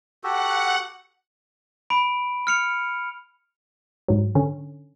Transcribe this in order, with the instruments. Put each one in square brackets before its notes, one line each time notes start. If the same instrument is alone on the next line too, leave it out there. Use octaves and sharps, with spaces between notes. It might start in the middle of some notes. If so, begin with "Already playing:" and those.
[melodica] F#4 G4 A4 [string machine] F#5
[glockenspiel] B5 D7
F6 C#7 F7
[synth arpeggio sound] G#2 F#3
D3 C#4